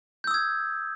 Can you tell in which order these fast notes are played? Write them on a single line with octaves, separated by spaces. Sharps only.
G6 E6 D#6 G#6